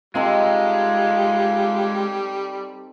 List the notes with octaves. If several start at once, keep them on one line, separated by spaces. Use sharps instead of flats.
G3 G#3 C4 D#4 F4 A4